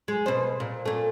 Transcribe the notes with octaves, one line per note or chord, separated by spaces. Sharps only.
G#3
B2 C5
A#2
A#2 A3